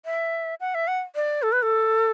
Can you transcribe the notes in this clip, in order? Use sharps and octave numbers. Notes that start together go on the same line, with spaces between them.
E5
F#5
E5
F#5
D5
A4
B4
A4